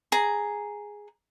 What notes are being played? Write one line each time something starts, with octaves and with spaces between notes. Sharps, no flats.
G#4 A#5